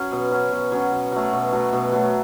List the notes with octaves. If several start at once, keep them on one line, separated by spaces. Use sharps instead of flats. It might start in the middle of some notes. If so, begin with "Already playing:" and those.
Already playing: F#3 C#4
B2
F#3 C#4
B2
F#3 C#4
B2
F#3 A3
B2
F#3 A3
B2
F#3 A3